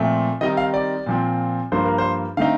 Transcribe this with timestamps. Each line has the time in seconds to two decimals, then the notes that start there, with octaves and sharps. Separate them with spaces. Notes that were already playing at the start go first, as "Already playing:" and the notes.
Already playing: A#2 F3 A3 C4
0.41 D#3 G3 C4 D#4 D#5
0.57 F5
0.74 D5
1.06 A#2 F3 C4
1.72 G2 F3 A#3 C5
1.85 A#4
1.98 C5
2.37 D3 A3 C4 D#4 F5